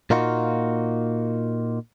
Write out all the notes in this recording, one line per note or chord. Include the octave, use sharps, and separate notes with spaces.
A#2 A#3 D#4 F4 F#4